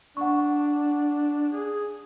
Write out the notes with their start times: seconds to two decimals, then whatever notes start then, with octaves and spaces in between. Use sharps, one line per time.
0.17 D4 F#5 C#6
1.52 G#4